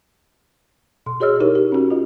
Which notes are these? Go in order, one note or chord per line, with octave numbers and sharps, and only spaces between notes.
B2 C6
F#4 G#4 C#5 D#5 E6 F6
D#4 E4 G4 A#4 C#5
G4
C#4 F#4
F4 D#5